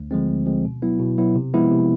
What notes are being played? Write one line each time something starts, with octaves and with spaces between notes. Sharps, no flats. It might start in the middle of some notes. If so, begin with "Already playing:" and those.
Already playing: D2
D3 F3 G#3 C4
D2
D3 F3 G#3 C4
B2
F#3 B3 E4
B2
F#3 B3 E4
C3
F3 G#3 B3 E4
C3